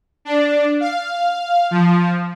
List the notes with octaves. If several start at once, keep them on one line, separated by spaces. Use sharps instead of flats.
D4
F5
F3